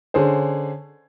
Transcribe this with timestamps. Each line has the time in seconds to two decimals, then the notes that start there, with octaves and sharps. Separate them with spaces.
0.14 D3 C#4 G#4 C5